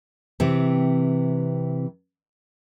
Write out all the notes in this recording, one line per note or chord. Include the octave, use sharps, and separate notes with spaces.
C3 E3 C4